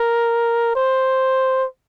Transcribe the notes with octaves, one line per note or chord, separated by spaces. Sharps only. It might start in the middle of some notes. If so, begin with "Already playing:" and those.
Already playing: A#4
C5